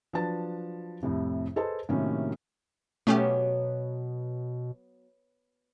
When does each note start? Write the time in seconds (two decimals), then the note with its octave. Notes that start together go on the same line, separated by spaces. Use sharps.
0.13 F3 F#3 D4 B4 A5 A6
1.03 C2 F2 A2 C3
1.56 G#4 A4 B4 C5 D#5 A5
1.89 A2 C3 D#3 F#3 A#3 C#4
3.07 B2 F#3 A3 B3 C#4 G4